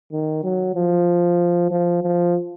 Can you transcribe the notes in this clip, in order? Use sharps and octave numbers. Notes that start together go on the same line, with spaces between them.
D#3
F#3
F3
F3
F3